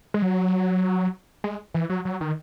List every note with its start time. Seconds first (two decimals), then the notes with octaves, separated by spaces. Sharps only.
0.14 G#3
0.22 F#3
1.44 G#3
1.74 E3
1.90 F#3
2.05 F#3
2.21 D#3